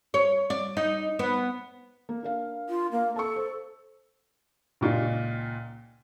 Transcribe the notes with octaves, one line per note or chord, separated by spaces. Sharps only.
C#5
D5
D#4
B3
A#3
D4 A#4 F5
F4
A#3
A4 A5 C#6
C5
C#2 A#2 D#4 F4